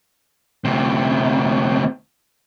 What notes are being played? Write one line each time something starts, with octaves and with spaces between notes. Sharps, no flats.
D2 C3